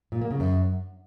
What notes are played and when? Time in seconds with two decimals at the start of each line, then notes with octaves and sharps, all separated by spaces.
0.12 A#2
0.21 A#3
0.31 C#3
0.40 F#2